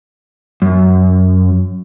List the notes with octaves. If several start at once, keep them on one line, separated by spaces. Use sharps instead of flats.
F#2